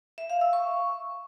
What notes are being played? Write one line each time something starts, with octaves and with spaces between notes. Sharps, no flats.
E5
F5
E6
C#6